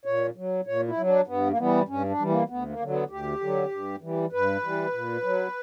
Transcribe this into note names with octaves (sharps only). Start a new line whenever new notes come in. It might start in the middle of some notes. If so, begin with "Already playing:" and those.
A#2 C#5
F#3
A#2 C#5
E4
F#3
D4
G2 B3
A#3
E3 G3 B3
G2 C#4
D4
E3 G3
A#3
D2 B3
A#3
D3 F#3
B3
D2 G4
D3 F#3
G2
E3 G3
G2 B4
E3 G3
A#2
F#3